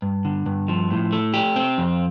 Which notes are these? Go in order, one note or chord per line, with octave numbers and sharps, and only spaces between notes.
G2
D3
G2
F3
A2
A3
G4
C4
F2